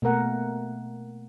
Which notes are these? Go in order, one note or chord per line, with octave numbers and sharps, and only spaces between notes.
B2 A3 A#3 A#4 F#5